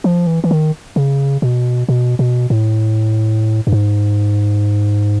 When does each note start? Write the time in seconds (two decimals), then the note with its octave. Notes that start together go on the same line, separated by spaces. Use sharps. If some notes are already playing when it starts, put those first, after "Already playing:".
0.04 F3
0.27 E3
0.44 E3
0.51 D#3
0.96 C#3
1.42 B2
1.89 B2
2.19 B2
2.50 A2
3.67 G2
3.72 G#2